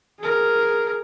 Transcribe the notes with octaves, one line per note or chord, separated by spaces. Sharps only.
G#4 A#4